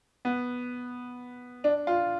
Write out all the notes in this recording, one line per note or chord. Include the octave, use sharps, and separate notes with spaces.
B3
D4
F4